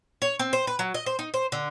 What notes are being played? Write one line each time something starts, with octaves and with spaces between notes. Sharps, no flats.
C#5
C4
C5
B4
F#3
D#5
C5
D#4
C5
D3